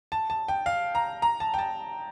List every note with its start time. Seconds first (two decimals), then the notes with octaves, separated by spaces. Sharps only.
0.12 A5
0.30 A5
0.48 G5
0.66 F5
0.95 A#5
1.22 A#5
1.40 A5
1.54 G5
1.59 A5